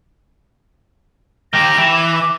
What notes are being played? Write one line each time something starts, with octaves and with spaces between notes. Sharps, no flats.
D#3 G4 A#6
E3
D6